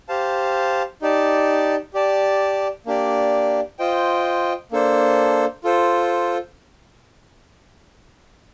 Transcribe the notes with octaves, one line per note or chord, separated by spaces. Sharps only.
G4 C5 F5 A5
D#4 G4 D5 A5
G4 D5 A5
A#3 D4 G4 D5
F4 C5 D#5 G5
A#3 D4 A4 C5
F4 A4 C5